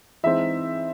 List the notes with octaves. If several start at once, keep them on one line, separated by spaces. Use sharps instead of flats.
E3 G#3 C4 D#4 E5